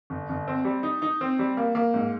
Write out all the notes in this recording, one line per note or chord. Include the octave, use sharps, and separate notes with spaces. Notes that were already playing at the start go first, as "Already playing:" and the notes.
G1
G1
C4
G3
D#4
D#4
C4
G3
A#3
A#3
G#2